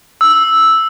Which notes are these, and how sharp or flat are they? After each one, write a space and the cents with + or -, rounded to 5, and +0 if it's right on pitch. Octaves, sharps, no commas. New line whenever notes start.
E6 -5